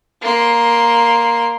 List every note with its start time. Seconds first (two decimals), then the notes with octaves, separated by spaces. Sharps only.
0.22 A#3 C6